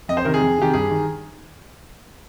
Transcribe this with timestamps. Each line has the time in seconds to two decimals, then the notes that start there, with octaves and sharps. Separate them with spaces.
0.09 F2 D#5
0.17 C5
0.25 C3 D#3 A#4
0.34 G#4
0.41 F2
0.58 C3 D#3 G4
0.73 G2 G#4
0.91 D#3